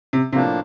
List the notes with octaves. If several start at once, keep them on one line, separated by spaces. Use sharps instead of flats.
C3
A2 C3 F3 A#3 D4